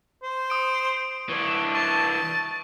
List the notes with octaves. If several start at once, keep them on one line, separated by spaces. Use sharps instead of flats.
C5
D#6 D7
E3 D4 C#5
A5 C#6